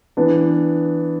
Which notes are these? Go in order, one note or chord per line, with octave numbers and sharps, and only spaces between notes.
E3 B3 D4